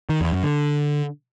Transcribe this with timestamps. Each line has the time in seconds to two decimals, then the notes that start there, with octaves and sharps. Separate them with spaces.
0.09 D#3
0.21 E2
0.32 F#2
0.44 D3